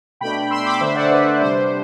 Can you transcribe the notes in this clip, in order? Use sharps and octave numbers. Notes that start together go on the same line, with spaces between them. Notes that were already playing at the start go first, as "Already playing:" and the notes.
B2 A3 D4 G5 B5
C6 E6
B5 D6
D3 A3 D4 C5 E5
D5 F#5
B4
C3 G3 D4 C5